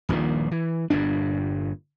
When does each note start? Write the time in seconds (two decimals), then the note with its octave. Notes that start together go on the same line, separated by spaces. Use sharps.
0.09 D#1 A#1 A#2 D#3
0.51 E3
0.90 G1 G2 A#2 D4